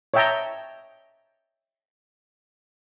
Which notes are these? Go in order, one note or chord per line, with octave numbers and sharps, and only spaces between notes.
C#5 D#5 E5 G5 A5 A#5